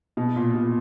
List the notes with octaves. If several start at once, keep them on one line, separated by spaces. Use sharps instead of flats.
B2
A#2
B2